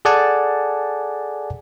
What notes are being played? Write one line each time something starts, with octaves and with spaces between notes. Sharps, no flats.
G#4 A4 D5 F#5 G#5 A5